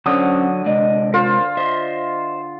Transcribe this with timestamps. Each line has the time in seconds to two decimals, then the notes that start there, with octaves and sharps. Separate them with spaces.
0.06 D3 F#3 C#4 C5 D#6
0.66 C3 G#3 D5 D#5
1.14 F4 A#4 C5
1.57 C5 D#5 E5